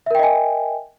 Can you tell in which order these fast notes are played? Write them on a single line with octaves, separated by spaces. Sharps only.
E5 A#4 G5 D#5 G#5